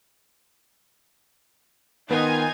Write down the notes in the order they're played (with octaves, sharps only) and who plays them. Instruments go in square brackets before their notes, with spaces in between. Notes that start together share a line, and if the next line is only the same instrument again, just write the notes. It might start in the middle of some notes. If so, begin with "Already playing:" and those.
[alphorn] D#3 [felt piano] B3 B4 [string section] D#4 F4 G#5